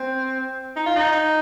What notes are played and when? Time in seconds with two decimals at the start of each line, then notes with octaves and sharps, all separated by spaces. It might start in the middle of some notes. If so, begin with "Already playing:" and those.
Already playing: C4
0.76 D#4
0.86 F4
0.96 D#4